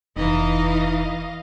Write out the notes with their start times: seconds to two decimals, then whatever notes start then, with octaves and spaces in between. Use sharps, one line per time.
0.17 F1 E3 D#4 D#5 F5